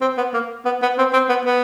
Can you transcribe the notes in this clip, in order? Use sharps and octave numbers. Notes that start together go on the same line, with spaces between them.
C4
B3
A#3
B3
B3
C4
C4
B3
B3